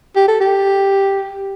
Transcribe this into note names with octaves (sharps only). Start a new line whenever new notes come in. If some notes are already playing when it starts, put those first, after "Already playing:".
G4
A4
G4